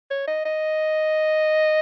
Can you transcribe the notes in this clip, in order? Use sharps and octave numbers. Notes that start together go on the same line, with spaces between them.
C#5
D#5
D#5